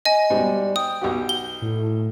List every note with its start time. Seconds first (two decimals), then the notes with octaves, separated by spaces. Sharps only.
0.05 D#5 G#5
0.30 G#2 B2 G3
0.76 G5 D#6
1.01 B1 F#4 G4
1.29 G7
1.62 A2